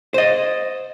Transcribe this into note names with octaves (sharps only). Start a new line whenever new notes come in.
C5 D#5